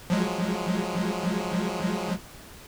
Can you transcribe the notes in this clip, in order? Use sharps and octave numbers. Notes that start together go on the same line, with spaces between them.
F3 F#3 G#3